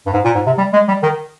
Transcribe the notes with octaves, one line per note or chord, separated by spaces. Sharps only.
G2
G#2
A#2
G#2
C3
G3
G#3
G3
D#3